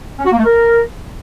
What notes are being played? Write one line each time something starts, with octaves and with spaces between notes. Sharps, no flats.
C#4
F#4
A#3
A3
A#4